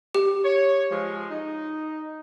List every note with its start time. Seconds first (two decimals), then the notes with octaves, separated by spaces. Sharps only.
0.15 G4
0.45 C#5
0.90 F3 G#3
1.30 D#4